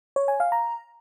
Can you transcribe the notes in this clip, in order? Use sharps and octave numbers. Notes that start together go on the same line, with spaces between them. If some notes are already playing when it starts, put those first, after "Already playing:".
C#5
G#5
F5
A#5